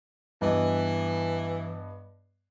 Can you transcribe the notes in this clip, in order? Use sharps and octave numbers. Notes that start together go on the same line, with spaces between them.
G2 E3 B3 D#5